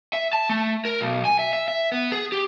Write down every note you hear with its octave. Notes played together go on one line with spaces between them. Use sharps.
E5
A5
A3
A#4
B1
G#5
E5
E5
E5
B3
G#4
G4